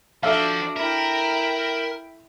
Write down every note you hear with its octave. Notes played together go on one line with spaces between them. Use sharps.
F3 D4 F#4 A4 E5 F5
E4 A#4 G5